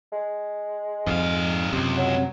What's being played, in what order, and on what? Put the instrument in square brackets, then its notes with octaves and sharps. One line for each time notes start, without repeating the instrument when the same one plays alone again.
[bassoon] G#3
[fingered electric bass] F2 [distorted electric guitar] G#2 F5
[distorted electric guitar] C#2 [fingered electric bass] F#2 C3
[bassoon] F#3